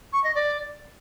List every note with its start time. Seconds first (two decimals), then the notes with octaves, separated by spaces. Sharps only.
0.12 C#6
0.23 D#5
0.34 D5